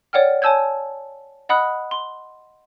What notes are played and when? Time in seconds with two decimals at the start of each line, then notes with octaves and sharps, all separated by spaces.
0.13 C#5 D5 F#5 G5 F6
0.42 C#5 G#5 A5 E6 G6 G#6
1.49 D#5 F#5 B5 D#6 F#6
1.91 C6